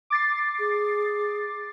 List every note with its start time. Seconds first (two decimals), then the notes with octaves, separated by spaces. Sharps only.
0.10 D6 A6 C7
0.59 G#4